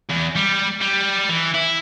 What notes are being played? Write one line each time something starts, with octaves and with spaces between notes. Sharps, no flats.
E2
G3
G3
E3
E4